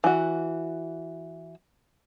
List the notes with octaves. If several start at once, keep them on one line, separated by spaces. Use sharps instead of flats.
E3 F#4